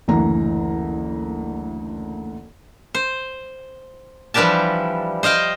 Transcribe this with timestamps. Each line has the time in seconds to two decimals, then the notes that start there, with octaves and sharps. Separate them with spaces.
0.08 F#1 D2 E3 A#5
2.95 C5
4.34 E3 F3 G3 D4 G4 A5
5.23 C5 D#5 F5 G5